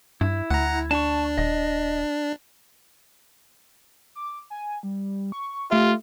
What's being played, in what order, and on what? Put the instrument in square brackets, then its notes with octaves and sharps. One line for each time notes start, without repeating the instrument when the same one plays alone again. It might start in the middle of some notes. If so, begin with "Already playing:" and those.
[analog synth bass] G2 [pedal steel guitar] E4
[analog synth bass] D2 [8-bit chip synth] F#5 A#5
[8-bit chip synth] D4 [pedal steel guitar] A5 C#6
[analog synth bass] D#1 [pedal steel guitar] D#5
[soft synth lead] D6
G#5
G3
C#6
[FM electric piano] A3 E5 [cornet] F4 [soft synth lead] G4